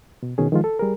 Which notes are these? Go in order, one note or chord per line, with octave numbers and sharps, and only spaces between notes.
B2
B2 D#3 C#4 G#4
D#3 F3 G#3 F4
A4
G3 G#4 A#4